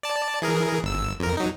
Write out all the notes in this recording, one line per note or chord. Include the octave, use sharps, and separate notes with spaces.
D5 A5
E3 G#4 A#4
G1 E6
F2 A#4
F#3 D#4